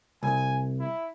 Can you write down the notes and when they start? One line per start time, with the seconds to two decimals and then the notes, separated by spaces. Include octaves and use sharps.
0.23 C2 G#5
0.79 E4